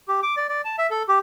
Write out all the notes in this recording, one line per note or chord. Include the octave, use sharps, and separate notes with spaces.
G4
D6
D5
D5
A5
E5
A4
G4